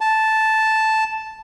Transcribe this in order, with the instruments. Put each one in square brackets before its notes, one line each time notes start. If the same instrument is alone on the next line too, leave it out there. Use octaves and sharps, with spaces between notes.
[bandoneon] A5